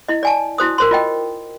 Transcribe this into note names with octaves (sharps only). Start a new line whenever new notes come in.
E4 D#5
D5 G#5 A5
E4 F#4 C5 D#6
A#4 C5 C6
F4 D#5 G5